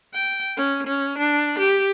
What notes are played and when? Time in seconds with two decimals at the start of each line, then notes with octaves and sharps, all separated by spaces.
0.14 G5
0.57 C#4
0.87 C#4
1.18 D4
1.59 G4